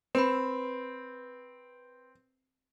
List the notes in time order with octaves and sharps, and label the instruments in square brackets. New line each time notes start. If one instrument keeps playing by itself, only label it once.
[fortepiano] C4 [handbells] B4 B5